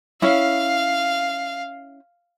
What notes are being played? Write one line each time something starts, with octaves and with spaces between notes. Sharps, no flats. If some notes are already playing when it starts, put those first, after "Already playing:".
C#4 E4 F5